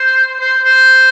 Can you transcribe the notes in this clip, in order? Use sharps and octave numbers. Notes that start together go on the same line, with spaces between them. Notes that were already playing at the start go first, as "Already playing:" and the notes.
Already playing: C5
C5
C5